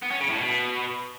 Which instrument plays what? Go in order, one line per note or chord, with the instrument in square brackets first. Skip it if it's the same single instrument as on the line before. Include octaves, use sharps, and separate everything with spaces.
[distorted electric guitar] B3
C#4
C#3
A2
B2